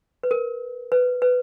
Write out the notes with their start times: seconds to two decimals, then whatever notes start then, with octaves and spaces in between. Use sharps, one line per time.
0.23 B4
0.31 A#4
0.92 B4
1.22 B4